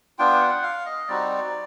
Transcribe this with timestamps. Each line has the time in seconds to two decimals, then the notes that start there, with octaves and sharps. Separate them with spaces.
0.19 B3 D4 F4 G5
0.40 F#5
0.63 F5
0.86 D#5
1.08 G3 C4 D#4 F#4 D5